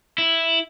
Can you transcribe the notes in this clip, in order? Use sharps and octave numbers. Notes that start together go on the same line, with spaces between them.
E4